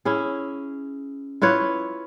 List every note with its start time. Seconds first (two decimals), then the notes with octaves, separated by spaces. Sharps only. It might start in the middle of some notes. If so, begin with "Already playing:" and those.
0.05 C#4 E4 G#4
1.42 E4 F4 B4 C#5